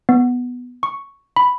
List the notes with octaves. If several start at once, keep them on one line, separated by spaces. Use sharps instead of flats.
B3
C#6
B5